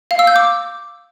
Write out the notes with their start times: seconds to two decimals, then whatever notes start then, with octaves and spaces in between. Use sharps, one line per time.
0.11 F5
0.19 E6
0.27 G6
0.36 D6